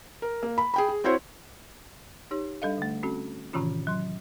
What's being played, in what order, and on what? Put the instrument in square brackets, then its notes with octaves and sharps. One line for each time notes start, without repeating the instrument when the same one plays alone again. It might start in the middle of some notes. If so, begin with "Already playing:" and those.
[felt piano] A#4
A#3
B5
G#4 G5 B5
G#4
C4 E4 F#4 C5 C#5
[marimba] D#4 G4 C#5
G3 D4 A4 D#5 F5
D3 A3
C4 C#4 F#4 A4
A2 C3 D#3 E3 C#4 F4
F#3 C6